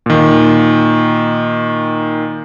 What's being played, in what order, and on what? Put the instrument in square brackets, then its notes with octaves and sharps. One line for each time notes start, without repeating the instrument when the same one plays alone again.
[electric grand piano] A#2 D#3